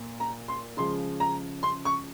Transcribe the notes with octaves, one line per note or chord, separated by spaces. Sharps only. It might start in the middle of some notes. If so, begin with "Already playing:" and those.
Already playing: A#2
A#5
C6
C#3 F3 G#3 C6
A#5
C6
C#6